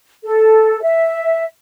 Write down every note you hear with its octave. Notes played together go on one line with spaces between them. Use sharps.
A4
E5